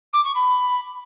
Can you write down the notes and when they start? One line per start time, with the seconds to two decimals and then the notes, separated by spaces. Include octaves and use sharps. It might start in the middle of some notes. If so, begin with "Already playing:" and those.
0.13 D6
0.24 C#6
0.35 B5